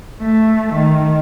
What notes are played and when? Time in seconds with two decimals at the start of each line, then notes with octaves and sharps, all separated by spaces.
0.21 A3
0.74 D#3